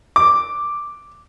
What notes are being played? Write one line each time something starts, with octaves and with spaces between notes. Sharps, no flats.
D6